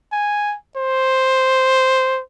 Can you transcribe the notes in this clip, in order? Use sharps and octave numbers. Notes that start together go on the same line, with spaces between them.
G#5
C5